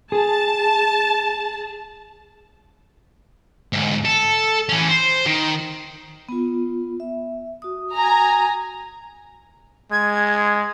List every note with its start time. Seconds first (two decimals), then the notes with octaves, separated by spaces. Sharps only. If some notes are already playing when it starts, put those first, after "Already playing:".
0.12 G#4 A5
3.73 D2 G#2
4.05 A4
4.69 E3 C#4
4.89 C5
5.26 D#3
6.29 B3 F4
7.00 E5
7.62 F#4 D#6
7.95 G#5 A#5
9.92 G#3 G#6